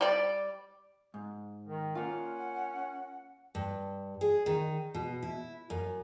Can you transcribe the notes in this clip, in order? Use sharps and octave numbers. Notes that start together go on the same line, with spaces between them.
G3 D5
G#2
D#3
A#3 C#4 F4 F#5
G2
G#4
D#3
B2
E4
F#2